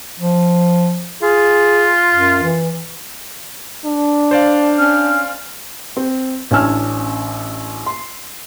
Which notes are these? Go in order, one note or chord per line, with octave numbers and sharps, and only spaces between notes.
F3
F4 G#4
F#2
E3
D4
C5 D5 F5
C#4 F6
C4
A1 C#4 D4 G#5 E6 F6
C6